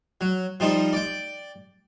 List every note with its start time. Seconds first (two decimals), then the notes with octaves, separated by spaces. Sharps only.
0.21 F#3
0.60 F3 G3 D#4 C5
0.93 D5 G5